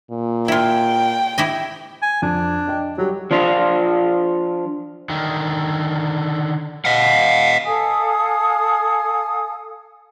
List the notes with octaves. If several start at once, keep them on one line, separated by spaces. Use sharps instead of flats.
A#2
E4 F4 G5
E4 G4 D#5
G#5
F2 D4
D5 D#5 G5
F#3 G3 G4
F3 D4 F4
D3 D#3
D#5 F5 F#5
A4 F5 G#5 D#6